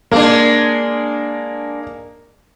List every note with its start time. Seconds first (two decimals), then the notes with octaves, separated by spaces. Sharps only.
0.12 G#3 A#3 D4